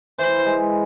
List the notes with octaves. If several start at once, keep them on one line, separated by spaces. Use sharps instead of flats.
E3 C5
G#3